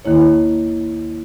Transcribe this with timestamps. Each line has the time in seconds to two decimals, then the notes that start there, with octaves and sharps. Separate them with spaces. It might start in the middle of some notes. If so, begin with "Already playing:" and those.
0.05 D#2 D#3 A#3 E4 C#5